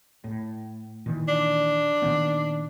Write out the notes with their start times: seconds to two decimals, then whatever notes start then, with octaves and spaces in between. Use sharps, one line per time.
0.24 A2
1.06 A#2 D#3 E3
1.28 D4
2.02 A#2 D#3 B3